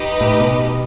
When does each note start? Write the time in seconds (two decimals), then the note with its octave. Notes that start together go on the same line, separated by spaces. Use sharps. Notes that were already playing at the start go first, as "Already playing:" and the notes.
Already playing: D#4 G4 B4 D#5
0.21 A2
0.40 B2